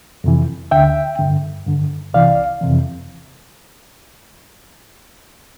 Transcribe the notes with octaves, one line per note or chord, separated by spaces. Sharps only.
F2 C3 E3
D2 D3 E5 G5
G2 D3
G2 D3
C2 C3 E3 D5 F5
F2 C3 E3